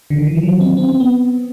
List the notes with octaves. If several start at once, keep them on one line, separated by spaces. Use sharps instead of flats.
D3
D#3
E3
F3
F#3
C4
C4
C4
B3